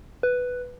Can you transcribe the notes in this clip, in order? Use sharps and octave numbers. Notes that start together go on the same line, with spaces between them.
B4